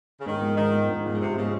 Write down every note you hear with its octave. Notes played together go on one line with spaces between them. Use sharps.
C#3
G#2 D#3
F3 G#3
G#2 D#3
F3 G#3
G#2
A#2 F3 G#3
C#3
G#2 C3
C#3 F3 G#3